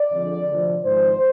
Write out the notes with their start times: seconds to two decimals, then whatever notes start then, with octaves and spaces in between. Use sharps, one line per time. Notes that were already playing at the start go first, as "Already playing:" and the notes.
Already playing: D5
0.11 F2 D3 G#3
0.46 D2 C3 F3
0.83 G#1 G#2 F3 G#3 C5